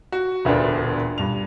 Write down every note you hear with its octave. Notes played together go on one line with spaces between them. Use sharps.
F#4
E1 D2 A#2 B3 D4 D5
G2 F7